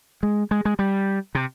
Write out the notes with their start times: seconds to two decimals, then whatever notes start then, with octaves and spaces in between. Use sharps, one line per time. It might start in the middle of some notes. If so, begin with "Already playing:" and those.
0.23 G#3
0.51 G#3
0.65 G#3
0.79 G3
1.35 C3